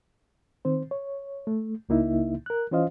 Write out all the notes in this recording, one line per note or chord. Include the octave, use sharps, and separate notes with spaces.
D#3 C4 C5
C#5
A3
C#2 C#3 A#3 D#4 E4 E5
A#4 F#6
E3 C#4 F4 C5 D#5 F5